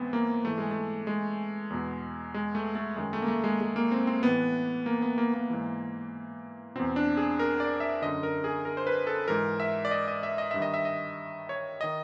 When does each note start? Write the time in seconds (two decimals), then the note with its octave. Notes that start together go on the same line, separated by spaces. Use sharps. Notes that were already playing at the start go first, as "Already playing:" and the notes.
Already playing: G#2 E3 B3 C4
0.13 A#3
0.45 G#2 E3 A3
0.58 G#3
0.71 A3
1.07 G#3
1.70 E2 B2
2.34 G#3
2.55 A3
2.75 A3
2.96 F#2 D#3 G#3
3.13 A3
3.22 A#3
3.28 A3
3.44 G#3
3.61 G#3
3.76 A#3
3.91 C4
4.07 C4
4.23 A2 E3 B3
4.86 A#3
5.02 B3
5.18 A#3
5.34 A#3
5.50 G#2 E3
6.75 E2 B2 C4
6.96 D4
7.17 G#4
7.39 A#4
7.60 D5
7.80 E5
8.02 F#2 D3 D#5
8.23 A#4
8.44 G#4
8.65 A#4
8.77 C5
8.87 B4
9.07 A4
9.28 G#2 E3 A#4
9.60 E5
9.85 D5
9.91 D#5
10.08 D#5
10.23 E5
10.38 D#5
10.51 G2 E5
10.59 D#3 D#5
10.74 E5
10.85 D#5
11.49 C#5
11.81 D#3 D#5